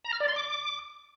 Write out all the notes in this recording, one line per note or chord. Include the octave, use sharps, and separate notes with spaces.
A#5
F6
D5
C6
D6